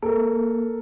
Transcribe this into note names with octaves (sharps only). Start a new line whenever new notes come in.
A#3 A4 A#4